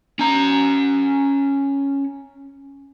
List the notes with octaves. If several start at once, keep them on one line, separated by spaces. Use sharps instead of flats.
C#4 A#5